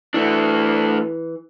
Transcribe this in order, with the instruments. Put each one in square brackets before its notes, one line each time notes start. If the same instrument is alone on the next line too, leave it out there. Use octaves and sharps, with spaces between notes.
[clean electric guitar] E3 [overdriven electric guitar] A3 D4